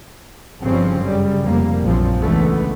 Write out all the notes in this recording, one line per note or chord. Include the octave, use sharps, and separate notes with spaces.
G1 G2 C#3 F3 C4 C#4
F#2 C#3 G3
F1 G3 A#3
A#1 F#2 F3 C4
C#2 D3 E3 A3 B3